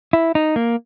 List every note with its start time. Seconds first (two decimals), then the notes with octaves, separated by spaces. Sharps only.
0.13 E4
0.35 D#4
0.56 A#3